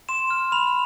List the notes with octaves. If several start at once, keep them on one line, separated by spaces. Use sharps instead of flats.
C6 E7
F6
B5 F7